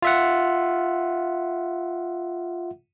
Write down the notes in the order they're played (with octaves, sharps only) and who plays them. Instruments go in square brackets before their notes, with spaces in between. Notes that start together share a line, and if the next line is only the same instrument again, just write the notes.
[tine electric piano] F4 E5 F#5